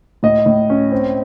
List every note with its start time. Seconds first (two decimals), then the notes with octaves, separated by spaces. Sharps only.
0.23 A2 D#5
0.46 A2
0.70 C#4
0.92 C4